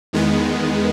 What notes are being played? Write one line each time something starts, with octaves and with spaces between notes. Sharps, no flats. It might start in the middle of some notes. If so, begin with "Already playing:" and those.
E2 D#3 G#3 B3